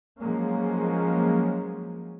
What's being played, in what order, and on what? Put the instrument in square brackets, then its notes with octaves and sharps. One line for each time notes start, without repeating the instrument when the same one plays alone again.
[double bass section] F3 F#3 G#3 A#3 C#4